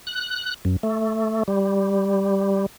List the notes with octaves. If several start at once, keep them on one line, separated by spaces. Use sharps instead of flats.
F#6
F#2
A3
G3